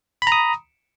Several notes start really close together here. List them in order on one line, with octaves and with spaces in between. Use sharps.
B5 A#5 D#6